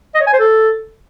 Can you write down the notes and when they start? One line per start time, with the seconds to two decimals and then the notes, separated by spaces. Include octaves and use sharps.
0.15 D#5
0.21 C#5
0.27 G#5
0.33 C5
0.39 A4